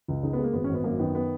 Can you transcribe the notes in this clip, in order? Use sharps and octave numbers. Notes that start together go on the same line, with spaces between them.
C#2
C#3 D#4
B3
G#3
A#3
G#1 B3
C#4
G#1 B3
F#2 A#3
D#3 B3
B3